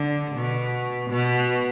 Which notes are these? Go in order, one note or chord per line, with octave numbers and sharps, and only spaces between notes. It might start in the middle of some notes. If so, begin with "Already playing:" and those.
Already playing: D3
B2
B2